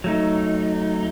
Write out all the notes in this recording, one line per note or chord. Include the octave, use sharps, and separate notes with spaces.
F#3 A3 D#4